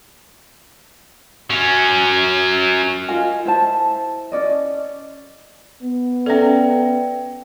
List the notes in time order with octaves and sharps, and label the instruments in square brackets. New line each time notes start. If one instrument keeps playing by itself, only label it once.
[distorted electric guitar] F#3 C#4
[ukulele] F4 A#4 D#5 G#5
E4 C5 A5
C#4 D5 D#5
[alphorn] B3
[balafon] C#4 A4 [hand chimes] D5 E5 G5